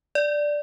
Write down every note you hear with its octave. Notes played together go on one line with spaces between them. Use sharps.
D5